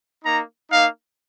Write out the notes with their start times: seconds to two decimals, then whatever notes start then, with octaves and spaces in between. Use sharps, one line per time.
0.24 A#3 D#4 A#5
0.70 A#3 D#4 F5